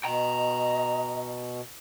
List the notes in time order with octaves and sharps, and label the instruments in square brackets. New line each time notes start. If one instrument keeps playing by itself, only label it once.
[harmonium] B2 [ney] D#5 [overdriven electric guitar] G5 A#5